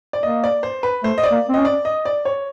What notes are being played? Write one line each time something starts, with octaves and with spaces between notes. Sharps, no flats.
D5
A#3 D#5
D5
C5
B4
A3 C5
D#5
D5
A#3
C4
C#4 D#5
D5
D#5
D5
C#5